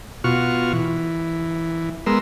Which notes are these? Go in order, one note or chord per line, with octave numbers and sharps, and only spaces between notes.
B2 F4 F#4 C#6 F6
E3
G#3 B3 A#4 C6 E6